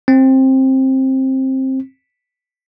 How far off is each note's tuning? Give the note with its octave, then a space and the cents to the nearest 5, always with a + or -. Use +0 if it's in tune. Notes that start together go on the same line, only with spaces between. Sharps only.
C4 +15